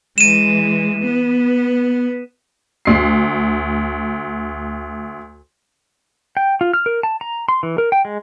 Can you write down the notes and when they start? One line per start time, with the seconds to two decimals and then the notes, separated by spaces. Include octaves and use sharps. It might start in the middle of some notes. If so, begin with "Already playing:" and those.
0.18 E3 G#3 D#7 E7
1.02 B3
2.85 D2 C7
6.37 G5
6.61 F4
6.73 F6
6.86 A#4
7.03 A5
7.21 A#5
7.49 C6
7.63 E3
7.78 A#4
7.92 G5
8.05 G#3